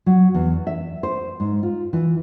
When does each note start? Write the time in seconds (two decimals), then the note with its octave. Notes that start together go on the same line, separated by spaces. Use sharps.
0.06 F#3
0.34 E2
0.67 E5
1.03 C5
1.40 G#2
1.63 F4
1.93 E3